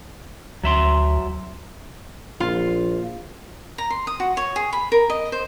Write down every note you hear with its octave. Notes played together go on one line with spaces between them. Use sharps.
D2 F#3 E5 C6
A#1 F4
A#5
C6
D#6
F#4
C#5
G#4
B5
A#4
D#5
C5